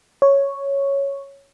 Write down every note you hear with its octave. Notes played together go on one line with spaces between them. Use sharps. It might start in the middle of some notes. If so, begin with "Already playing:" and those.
C#5